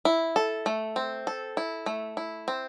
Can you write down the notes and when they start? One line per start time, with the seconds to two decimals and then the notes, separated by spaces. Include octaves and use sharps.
0.05 E4
0.36 A4
0.66 A3
0.96 C4
1.27 A4
1.57 E4
1.86 A3
2.17 E4
2.48 C4